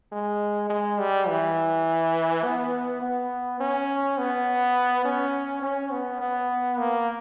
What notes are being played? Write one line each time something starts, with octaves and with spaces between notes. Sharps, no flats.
G#3
G#3
G3
E3
B3
B3
C#4
B3
C#4
C#4
B3
B3
A#3